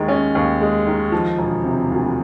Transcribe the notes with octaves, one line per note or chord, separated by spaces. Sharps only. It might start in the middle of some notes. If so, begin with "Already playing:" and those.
Already playing: D#2 D#3 G#3
C#4
D#2
G#3
D#3
F3
E1
C3
D2